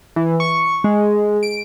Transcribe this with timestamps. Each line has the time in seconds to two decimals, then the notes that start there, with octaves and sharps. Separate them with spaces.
0.16 E3
0.40 C#6
0.84 G#3
1.43 D7